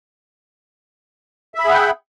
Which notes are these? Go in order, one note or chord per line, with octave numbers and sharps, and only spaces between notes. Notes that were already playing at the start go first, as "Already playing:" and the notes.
G#4 E5 F#5 G5 B5